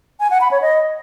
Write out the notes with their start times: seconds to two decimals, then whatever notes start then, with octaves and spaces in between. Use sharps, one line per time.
0.20 G#5
0.30 F#5
0.41 B5
0.51 C#5
0.62 D#5